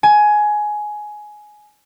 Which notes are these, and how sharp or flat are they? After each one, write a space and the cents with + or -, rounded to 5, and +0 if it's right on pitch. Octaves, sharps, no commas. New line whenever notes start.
G#5 +15